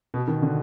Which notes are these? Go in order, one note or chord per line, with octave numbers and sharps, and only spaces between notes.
B2
D#3
D3